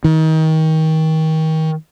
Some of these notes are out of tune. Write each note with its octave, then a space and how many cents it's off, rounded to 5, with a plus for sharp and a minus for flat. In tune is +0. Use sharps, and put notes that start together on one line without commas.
D#3 +30